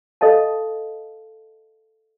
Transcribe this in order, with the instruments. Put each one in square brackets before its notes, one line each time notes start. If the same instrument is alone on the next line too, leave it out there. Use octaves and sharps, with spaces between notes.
[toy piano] A4 D#5 F5 A5